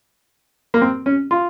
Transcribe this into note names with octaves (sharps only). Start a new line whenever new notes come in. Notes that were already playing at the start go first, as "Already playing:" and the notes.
A#3
C4
C#4
F4